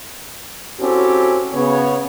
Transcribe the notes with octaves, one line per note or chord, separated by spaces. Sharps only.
C4 C#4 E4 F#4 G4 A4
C#3 B3 C#5